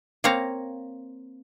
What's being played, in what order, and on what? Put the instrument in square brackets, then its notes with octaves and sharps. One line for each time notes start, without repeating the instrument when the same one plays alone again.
[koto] A#3 C4 C#5 F5 A#5